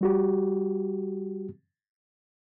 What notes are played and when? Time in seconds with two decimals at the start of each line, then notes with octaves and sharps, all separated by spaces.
0.01 G3 F#4 G4